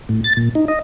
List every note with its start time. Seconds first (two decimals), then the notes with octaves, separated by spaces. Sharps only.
0.09 A2
0.24 A6
0.37 A#2
0.55 D#4
0.68 D#5